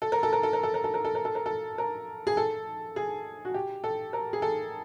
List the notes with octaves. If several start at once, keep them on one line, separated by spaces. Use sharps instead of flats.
A4
A#4
A4
A#4
A4
A#4
A4
A#4
A4
A#4
A4
A#4
A4
A#4
A4
A#4
G#4
A4
G#4
F#4
G4
A4
A#4
G#4
A4